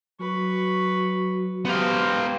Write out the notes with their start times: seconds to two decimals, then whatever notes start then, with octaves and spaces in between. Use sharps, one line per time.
0.20 F#3 B4 C#6
1.65 B3 G4 C5 F5